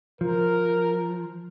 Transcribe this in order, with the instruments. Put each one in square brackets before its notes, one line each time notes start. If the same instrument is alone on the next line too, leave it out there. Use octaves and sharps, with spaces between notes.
[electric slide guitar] F3 [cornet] A#4